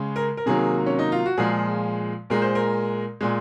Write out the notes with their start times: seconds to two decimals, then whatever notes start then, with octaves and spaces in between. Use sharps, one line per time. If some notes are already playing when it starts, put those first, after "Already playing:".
Already playing: C#3 G#3
0.16 A#4
0.37 A#4
0.46 C3 D#3 F#3 A#3 G#4
0.86 C#4
0.99 D#4
1.12 F4
1.26 F#4
1.38 A#2 F3 G#3 G#4
2.30 A#2 G#3 A#4
2.42 C5
2.55 A#4
3.21 A#2 G#3